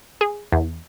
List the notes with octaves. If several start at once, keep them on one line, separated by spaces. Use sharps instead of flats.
G#4
E2